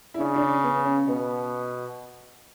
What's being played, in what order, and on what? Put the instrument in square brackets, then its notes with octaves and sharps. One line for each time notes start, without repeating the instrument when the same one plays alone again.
[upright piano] E4
[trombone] C#3 [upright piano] D4
[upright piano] D4
C#4
B3
C#4
[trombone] B2 [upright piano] B3